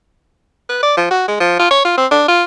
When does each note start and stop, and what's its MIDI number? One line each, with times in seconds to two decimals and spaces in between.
0.69 0.81 71
0.83 0.95 74
0.97 1.06 53
1.11 1.25 66
1.28 1.35 56
1.40 1.56 53
1.59 1.67 65
1.71 1.82 73
1.85 1.93 65
1.97 2.06 60
2.11 2.27 62
2.28 2.44 65